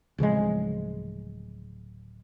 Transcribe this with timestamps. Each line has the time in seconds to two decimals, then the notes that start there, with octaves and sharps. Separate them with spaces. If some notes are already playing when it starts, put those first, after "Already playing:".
0.18 D1 C#3 F3 G#3